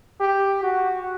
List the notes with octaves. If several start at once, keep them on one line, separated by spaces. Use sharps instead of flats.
G4
F#4